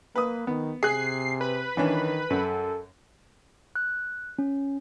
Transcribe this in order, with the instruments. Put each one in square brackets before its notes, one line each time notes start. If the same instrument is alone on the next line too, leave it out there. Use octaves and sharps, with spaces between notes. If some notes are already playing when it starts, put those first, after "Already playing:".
[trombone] A#3 [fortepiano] B4 D#6
[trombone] D#3 [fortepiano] B3
[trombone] C3 [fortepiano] G#4 F#6 [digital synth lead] C7
[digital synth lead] B4
[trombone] D#3 [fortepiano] E3 C#4 D4
[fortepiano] F#2 [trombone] A4
[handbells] F#6
C#4